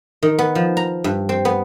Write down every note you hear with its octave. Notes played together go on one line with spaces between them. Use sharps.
D#3
B3
F3
A#5
G2
C4
B3